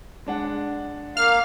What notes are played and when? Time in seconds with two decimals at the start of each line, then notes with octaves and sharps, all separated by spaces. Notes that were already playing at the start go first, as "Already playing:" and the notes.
0.26 G#3 D4 F#5
1.17 A#3 F5 F6